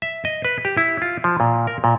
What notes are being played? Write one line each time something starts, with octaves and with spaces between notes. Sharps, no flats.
E5
D#5
B4
G4
E4
F4
F3
A#2
A#4
A#2